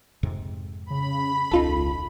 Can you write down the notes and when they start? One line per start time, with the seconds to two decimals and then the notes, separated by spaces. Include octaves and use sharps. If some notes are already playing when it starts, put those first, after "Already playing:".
0.23 F2 G#2 C3
0.90 C#3 B5
1.51 E1 C#2 C#4 D#4 F4 A4